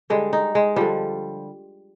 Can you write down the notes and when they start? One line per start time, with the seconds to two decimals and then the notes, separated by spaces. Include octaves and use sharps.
0.10 D3 G3 G#3
0.33 D#4
0.55 G#3
0.76 D3 F3 G3